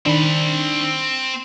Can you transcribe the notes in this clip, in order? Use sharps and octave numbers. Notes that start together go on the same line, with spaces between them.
D#3 C4 D4 B5